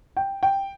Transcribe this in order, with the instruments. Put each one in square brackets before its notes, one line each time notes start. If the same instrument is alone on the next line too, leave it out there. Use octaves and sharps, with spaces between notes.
[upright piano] G5
G5